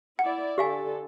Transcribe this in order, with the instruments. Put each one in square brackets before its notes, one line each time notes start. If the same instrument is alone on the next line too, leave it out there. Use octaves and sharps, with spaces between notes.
[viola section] E4 D5 [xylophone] F#5
[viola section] D3 A4 [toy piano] G4 F5 G#5